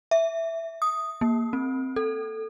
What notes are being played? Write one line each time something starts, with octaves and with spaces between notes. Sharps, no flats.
E5
D#6
A#3
C4
A4